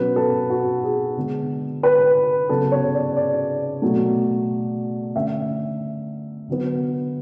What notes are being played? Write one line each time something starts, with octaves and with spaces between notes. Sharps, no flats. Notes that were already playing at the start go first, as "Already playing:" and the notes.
Already playing: B2 F#3 C#4 B4
A4
F#4
G#4
D3 G#3 B3
B4
C#3 F#3 B3 A4
C#5
D5
D5
B2 F#3 A3
D3 A3 C#4 E5
D3 F#3 B3